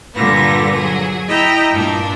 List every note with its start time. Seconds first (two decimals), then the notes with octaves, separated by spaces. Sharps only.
0.16 G2 A#2 D3 G3 B3 A#6
0.74 F#3 G#4
1.29 E4 D#5 G5 A#5
1.70 G2 A#2 D4